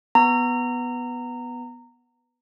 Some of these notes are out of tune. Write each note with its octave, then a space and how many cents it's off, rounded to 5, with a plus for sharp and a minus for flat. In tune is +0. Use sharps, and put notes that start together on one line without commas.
B3 +0 A#5 -20